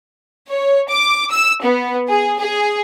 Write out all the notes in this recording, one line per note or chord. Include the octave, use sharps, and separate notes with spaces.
C#5
D6
E6
B3
G#4
G#4